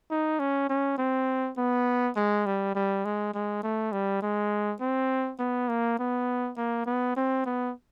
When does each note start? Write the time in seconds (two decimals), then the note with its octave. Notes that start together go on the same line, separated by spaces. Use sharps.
0.11 D#4
0.39 C#4
0.70 C#4
0.98 C4
1.57 B3
2.16 G#3
2.46 G3
2.75 G3
3.05 G#3
3.34 G#3
3.63 A3
3.92 G3
4.22 G#3
4.80 C4
5.39 B3
5.69 A#3
5.99 B3
6.57 A#3
6.86 B3
7.17 C4
7.46 B3